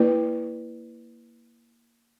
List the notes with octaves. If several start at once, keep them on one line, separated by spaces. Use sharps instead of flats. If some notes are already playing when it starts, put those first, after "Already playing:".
Already playing: A#3 E4 B4 D5